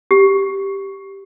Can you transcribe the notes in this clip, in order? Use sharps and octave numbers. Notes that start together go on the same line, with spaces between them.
G4